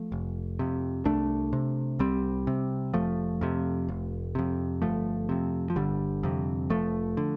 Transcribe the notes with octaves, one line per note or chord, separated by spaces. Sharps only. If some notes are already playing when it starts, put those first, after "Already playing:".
Already playing: F3 A3
F1
F2 C3
C2 A3 D4
C3
C2 G3 C4
C3
F1 F3 A3
F2 C3
F1
F2 C3
G1 F3 A3
F2 C3
F3
G1 D3 G3
F2 C3
F1 F3 A3
D3